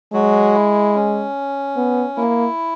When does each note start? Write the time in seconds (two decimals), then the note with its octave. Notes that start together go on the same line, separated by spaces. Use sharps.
0.13 F#3 G#3 F#4
0.54 E4
0.95 C#4
1.76 B3
2.17 A#3 E4